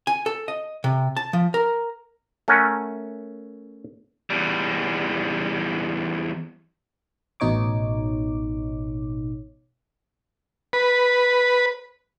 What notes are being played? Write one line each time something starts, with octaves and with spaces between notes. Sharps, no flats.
G#5
A4
D#5
C3
A5
F3
A#4
A3 C#4 A#4 F#5 G#5
E2 G3
A1 B2 D#4 C#5 D6
B4